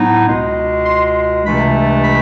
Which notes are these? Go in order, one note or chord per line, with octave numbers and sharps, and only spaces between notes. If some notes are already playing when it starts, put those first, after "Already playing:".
Already playing: A2 F#3 B3 D#4
C#2 B2 G#3
C6
C#2 C3 E3 A3 D4 B5
B5